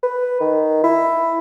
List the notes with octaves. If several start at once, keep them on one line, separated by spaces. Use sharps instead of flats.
B4
D#3
E4